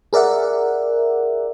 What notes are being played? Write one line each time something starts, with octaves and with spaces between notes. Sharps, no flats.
G#4 A#4 D5 E5 F#5